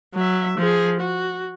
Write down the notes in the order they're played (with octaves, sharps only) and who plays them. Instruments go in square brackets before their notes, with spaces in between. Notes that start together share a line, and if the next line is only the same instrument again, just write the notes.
[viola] F#3 E5
F3 G#4
F#4